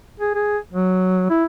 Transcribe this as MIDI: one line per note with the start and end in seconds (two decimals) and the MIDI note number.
0.20 0.33 68
0.35 0.58 68
0.73 1.26 54
1.30 1.45 64